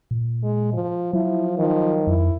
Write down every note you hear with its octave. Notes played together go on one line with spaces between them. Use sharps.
A#2
G#3
F3
F3 F#3 E4
D#3 F3
F2 E4